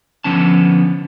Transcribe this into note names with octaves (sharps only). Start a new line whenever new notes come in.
D3 F3 B3 C#4 A5